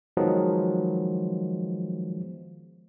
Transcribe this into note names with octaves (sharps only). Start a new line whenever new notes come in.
D#3 F3 F#3 G#3 B3